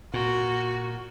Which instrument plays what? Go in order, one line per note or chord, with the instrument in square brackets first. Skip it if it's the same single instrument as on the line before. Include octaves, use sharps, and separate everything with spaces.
[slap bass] A#2 [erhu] F#4